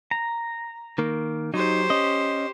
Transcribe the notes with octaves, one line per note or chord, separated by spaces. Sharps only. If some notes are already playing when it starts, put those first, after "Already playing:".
A#5
D#3 A#3
F#3 D#4 G4 C5
C#4 D#5